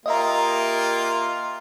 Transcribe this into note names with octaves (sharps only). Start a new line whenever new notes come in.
A#3 F4 G4 D#5 E5 A#5